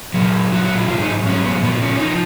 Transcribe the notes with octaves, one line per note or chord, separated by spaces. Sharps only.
A#2 F#3
A#2 F#3 F#4
F#4
F4
G#2 F#3 F4
D#4
G#2 F#3 C#4
B3
A#2 F3 B3
C#4
C#4
D#4
F3